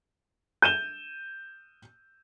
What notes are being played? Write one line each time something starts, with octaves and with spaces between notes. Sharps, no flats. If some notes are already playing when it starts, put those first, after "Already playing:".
G6 D#7 E7 G7